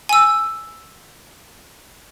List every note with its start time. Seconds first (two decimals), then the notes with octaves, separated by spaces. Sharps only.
0.09 G#5 E6